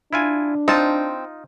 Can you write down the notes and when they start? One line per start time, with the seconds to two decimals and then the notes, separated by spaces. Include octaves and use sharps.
0.13 D4 E4 F4 G#5
0.68 C4 D#4 F4 A5